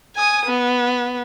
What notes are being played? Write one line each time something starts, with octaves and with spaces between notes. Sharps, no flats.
G#5 D#6
B3